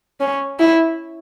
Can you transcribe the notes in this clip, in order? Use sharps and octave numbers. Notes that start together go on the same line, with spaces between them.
C#4
E4